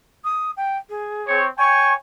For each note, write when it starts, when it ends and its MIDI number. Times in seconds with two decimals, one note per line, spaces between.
0.24 0.51 87
0.57 0.77 79
0.89 1.42 68
1.28 1.47 60
1.28 1.47 73
1.58 1.93 73
1.58 1.93 79
1.58 1.93 80
1.58 1.93 85